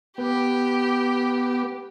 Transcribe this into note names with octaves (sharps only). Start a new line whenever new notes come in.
B3 G4